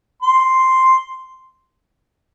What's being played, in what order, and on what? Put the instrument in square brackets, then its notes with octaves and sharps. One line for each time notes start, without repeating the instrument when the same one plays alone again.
[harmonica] C6